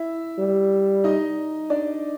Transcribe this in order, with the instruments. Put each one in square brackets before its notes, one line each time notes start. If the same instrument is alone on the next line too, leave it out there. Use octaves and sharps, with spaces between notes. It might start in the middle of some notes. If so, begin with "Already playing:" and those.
Already playing: [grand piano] E4 E5
[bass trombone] G3
[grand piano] D#4 D#5
D4 D5